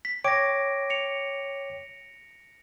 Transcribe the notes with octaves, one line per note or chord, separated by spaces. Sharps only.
B6
C#5 G5 D6 A#6 D7
C#7 F7